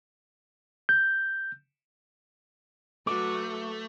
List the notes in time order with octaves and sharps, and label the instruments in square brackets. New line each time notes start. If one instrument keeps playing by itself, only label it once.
[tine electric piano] G6
[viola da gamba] F#3 F#4 B4 [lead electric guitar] A3 [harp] D6